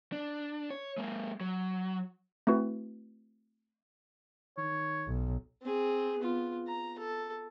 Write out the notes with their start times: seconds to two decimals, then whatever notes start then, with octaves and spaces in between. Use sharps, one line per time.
0.12 D4
0.71 C#5
0.98 G#3 A#3
1.41 F#3
2.47 A3 C4 E4 F#4 B4
4.57 D#3 C#5
5.08 B1
5.63 C4 G#4
6.19 B3 F4
6.67 A#5
6.98 A4